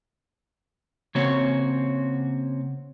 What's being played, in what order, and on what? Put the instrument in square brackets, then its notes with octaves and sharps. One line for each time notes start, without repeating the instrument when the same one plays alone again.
[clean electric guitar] C#3 A#3 C4 F#4 C#5